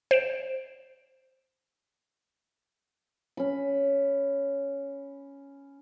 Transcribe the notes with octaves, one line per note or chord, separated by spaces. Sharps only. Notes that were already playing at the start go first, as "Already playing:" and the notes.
C5 D7 E7
C#4 B5